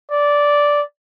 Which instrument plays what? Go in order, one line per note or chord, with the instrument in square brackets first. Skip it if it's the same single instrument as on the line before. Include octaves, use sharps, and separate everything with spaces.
[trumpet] D5